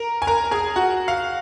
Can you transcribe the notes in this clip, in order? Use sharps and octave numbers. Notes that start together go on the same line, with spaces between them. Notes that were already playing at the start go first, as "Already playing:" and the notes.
Already playing: A#4 A#5
G#5
A#4 A#5
G#4 G#5
F#4 F#5
F5